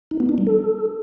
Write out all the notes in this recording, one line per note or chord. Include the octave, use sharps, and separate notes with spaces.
D#4
B3
D4
G3
A4